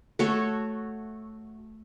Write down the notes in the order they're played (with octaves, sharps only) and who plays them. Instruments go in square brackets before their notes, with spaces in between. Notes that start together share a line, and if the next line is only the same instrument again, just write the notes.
[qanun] A3 F#4 A4 C#5